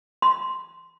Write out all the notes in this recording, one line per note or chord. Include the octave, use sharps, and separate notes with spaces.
C6